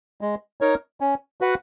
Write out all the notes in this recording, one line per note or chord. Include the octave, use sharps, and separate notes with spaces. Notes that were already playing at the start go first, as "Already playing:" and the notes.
G#3
D#4 A#4 C#5
C#4
F#4 B4 F#5